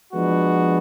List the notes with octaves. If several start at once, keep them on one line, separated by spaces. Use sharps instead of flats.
F3 G#3 B3 D4 F#4